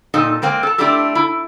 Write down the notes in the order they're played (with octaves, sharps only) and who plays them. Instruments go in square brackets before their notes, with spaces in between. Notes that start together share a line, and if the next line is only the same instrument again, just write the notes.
[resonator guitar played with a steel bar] A#2 C4 D#4 A4 D#5
G#3 A#3 C4 G5
A4 A5
A3 C4 D4 E4 G4 A4
E4